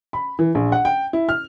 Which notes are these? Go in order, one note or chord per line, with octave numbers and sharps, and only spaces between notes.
B5
E3
A#1
F#5
G5
E4
F6